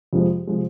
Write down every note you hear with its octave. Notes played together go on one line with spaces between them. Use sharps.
F2 C3 F3 G#3
C3 F3 G#3